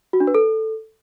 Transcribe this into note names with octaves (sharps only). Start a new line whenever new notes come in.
F#4
D4
B4
A4